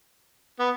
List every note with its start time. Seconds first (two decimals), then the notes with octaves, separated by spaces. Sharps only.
0.60 B3